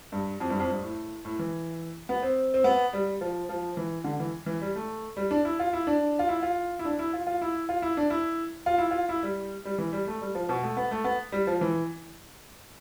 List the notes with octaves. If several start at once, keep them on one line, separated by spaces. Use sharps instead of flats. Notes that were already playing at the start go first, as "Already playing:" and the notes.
G2
F2
G2
F2
G2
A2
A2
E3
B3
C4
C4
B3
G3
F3
F3
E3
D3
E3
E3
G3
A3
G3
D4
E4
F4
E4
D4
F4
E4
F4
E4
D4
E4
F4
F4
E4
F4
E4
D4
E4
F4
E4
F4
E4
G3
G3
E3
G3
A3
G3
F3
B2
A3
B3
A3
B3
G3
F3
E3